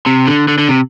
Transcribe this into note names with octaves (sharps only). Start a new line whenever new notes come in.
C3
D3
D3
D3
C3